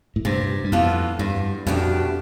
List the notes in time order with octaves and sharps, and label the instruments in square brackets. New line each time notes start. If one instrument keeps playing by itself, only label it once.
[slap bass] A2
[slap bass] G2 [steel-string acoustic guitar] C3
[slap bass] G2
[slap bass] F2 [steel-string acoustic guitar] E3 B3 F4 A4
[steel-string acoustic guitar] E2 [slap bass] G2
[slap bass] F2 [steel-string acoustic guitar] B2 A3 D4 G4